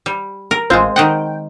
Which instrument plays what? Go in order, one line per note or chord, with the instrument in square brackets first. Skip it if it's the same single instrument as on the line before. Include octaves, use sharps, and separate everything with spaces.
[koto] G3
A#4
[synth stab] A1 F4 C5 [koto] G#3 C4
[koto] D#3 D#5 F#5 [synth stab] G5